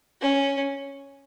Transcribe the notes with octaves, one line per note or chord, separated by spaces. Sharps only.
C#4